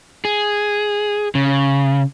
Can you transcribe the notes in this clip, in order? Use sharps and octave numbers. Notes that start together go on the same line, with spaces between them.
G#4
C#3